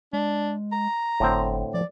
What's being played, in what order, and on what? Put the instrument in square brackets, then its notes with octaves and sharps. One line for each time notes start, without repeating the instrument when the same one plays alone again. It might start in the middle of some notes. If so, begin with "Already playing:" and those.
[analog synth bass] G#3 [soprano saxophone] D4
[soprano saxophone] A#5
[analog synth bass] G1 [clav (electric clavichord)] A2 D3 C4
[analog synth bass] F3 [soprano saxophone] D5